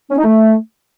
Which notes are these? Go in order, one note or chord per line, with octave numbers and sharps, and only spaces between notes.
C#4
D#4
A3